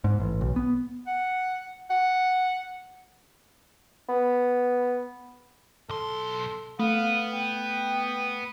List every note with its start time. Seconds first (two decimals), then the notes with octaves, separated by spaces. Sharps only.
0.04 G#2
0.20 A1
0.41 B1
0.56 B3
1.07 F#5
1.90 F#5
4.09 B3
5.89 B1 A4 C6
6.80 A3 B3 F5
7.33 G5